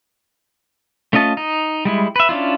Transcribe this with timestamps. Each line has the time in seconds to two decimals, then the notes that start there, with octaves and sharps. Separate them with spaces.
1.13 A3 C#4 F4 D#5 A5
1.37 D#4
1.85 G3 G#3 E4
2.16 B4 E5
2.29 C#4 D4 E4 F4